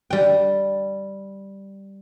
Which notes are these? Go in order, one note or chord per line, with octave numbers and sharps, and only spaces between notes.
G3 G5